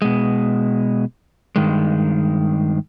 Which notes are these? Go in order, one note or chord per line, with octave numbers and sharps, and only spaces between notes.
B2 G#3
G2 D#3 G#3